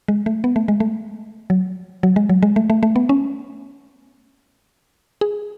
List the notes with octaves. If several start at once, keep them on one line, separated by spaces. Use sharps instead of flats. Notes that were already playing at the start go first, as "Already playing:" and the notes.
G#3
A3
B3
A3
G#3
A3
F#3
F#3
G#3
F#3
G#3
A3
A3
A3
B3
C#4
G#4